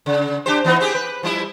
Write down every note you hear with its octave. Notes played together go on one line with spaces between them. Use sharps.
C#3
D4 G4 C5
E3 B3 D#4
C4 G4 G#4
B4
F3 G3 E4